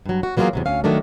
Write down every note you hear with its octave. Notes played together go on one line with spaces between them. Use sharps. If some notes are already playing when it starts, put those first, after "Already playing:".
G2 F#3
F#4
E3 F#3 A#3 B3 F4 G#4
E2 C3 F#3
D2 C#4 F5
D#3 F#3 A3 D4 A#4